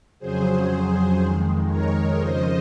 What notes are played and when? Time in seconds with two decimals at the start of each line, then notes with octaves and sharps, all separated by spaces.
0.19 F2 C#3 F#3 G#4 C5
1.17 F2 D#3 G#3
1.68 A#4 C#5
2.16 F2 C#3 F3 C5 D#5